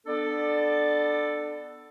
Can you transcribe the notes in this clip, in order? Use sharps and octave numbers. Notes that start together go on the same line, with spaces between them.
B3 D4 A4 D5